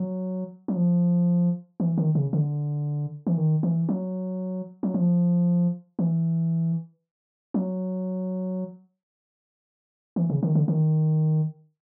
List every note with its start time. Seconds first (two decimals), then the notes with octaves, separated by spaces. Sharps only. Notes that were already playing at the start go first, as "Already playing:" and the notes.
Already playing: F#3
0.68 F#3
0.76 F3
1.80 E3
1.98 D#3
2.15 C#3
2.33 D3
3.27 E3
3.37 D#3
3.63 E3
3.89 F#3
4.83 F#3
4.94 F3
5.99 E3
7.54 F#3
10.16 E3
10.30 C#3
10.43 D#3
10.55 D3
10.68 D#3